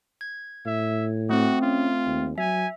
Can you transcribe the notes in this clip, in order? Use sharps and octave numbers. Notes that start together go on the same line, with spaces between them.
G#6
A2 E5
A3 C4 F#4
C#4 F4
D#2
F#3 E5 G#5